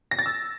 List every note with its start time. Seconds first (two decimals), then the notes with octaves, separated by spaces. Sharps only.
0.11 A#6
0.19 A6
0.26 E6